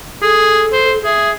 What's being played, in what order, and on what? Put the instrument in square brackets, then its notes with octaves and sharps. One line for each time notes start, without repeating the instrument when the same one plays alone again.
[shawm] G#4 [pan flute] A4
[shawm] C5
[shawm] G#4 [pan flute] E5